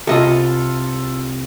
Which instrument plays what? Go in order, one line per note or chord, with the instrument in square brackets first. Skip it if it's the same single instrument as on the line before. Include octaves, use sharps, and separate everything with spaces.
[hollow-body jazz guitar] C2 D#5 [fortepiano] F4 A4